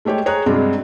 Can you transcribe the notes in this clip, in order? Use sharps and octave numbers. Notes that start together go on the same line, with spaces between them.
G#3 A3 G4 C#5 G5
G#4 C#5 A#5 D#6 F#6
G2 C3 F#3 G#3